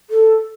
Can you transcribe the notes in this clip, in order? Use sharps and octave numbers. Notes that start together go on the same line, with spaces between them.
A4